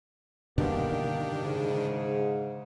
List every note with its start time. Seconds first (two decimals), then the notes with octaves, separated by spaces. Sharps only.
0.58 G2 B2 D3 D#3 A#3 D4 G4
1.43 G#2 C#3